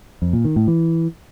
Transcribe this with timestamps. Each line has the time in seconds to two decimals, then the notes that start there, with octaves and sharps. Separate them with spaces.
0.22 F2
0.33 A#2
0.45 D#3
0.56 A2
0.68 E3